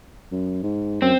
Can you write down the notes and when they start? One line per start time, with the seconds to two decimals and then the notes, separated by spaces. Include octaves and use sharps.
0.32 F#2
0.63 G#2
1.02 F#2 C4